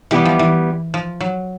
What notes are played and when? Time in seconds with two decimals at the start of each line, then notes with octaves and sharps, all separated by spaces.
0.11 E3 G3 B3 E4 G4
0.25 F3
0.39 E3
0.94 F3
1.21 F#3